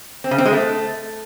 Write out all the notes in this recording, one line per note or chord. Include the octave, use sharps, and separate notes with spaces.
C4
C#3
C4
G#3
A3